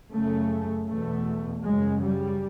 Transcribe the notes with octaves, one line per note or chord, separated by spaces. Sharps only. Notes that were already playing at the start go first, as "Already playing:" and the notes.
F#2 C#3 A3
E2 B2 A3
F#2 C#3 G#3
G3